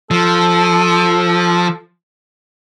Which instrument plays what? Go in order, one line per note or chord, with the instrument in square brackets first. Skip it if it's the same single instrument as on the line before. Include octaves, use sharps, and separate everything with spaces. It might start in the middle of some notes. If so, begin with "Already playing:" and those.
[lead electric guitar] F3 [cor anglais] A4